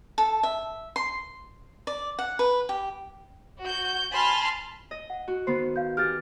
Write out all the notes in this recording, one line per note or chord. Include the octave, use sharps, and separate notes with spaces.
A4
E5
C6
D5
F#5
B4
G4
F#4 G6
G#5 A5 B5 C6 F6
D#5
F#5
F#4
D#3 B3 C5 C6 C7
F5 G6
G4 G#4 F6 A6